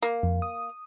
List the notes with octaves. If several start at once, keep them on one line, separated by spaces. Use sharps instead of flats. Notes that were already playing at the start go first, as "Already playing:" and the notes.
A#3
F2
D#6